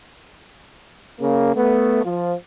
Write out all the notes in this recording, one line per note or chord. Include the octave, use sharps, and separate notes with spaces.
C#3 A#3
A3 B3
F3